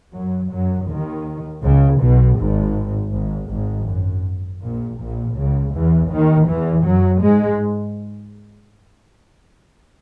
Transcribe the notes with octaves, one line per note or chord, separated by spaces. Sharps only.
F#2 F#3
F#2 F#3
D#2 D#3
C#2 C#3
B1 B2
G#1 G#2
G#1 G#2
G#1 G#2
F#2
A#1 A#2
A#1 A#2
C#2 C#3
E2 E3
D#2 D#3
E2 E3
F#2 F#3
G#2 G#3